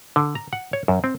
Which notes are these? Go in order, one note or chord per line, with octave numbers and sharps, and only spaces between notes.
D3
A#5
F#5
C#5
F#2
C4